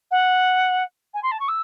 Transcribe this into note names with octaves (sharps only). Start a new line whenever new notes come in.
F#5
G#5
C6
A5
C#6
E6